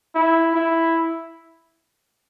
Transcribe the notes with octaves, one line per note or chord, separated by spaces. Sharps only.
E4
E4